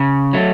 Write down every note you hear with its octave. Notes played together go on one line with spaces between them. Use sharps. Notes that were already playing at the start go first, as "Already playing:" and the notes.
Already playing: C#3
F#3 A3